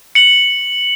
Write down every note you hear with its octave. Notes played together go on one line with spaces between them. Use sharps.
C#7 F#7